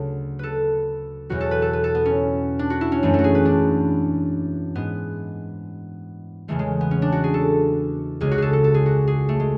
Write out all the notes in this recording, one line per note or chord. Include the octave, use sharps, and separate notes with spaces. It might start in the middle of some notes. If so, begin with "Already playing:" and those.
Already playing: D2 C#3 F#3 A4
A4 B4
E2 B2 F#3 F#4
A4
B4
A4
B4
A4
B3
C#4
D4
F#4
E4
C#4
F#2 E3 G#3 A3
A3 F#4
G#4
B4
D4
G#2 G#3 B3
E2 C#3 E3 G#3 A3
G#3
B3
C#4
D4
F#4
G#4
A4
C#2 C#3 G#3 G#4
F#4
G#4 A4
A4
A4
G#4
F#4
G#4
A3
G#3